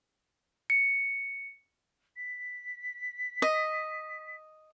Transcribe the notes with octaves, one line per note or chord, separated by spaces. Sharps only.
C#7
B6
D#5